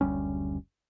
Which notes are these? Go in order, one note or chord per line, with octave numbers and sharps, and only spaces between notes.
F#1 D2 G3 C#4